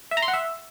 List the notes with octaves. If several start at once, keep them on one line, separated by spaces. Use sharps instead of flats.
E5
A#5
C6
F#5
E5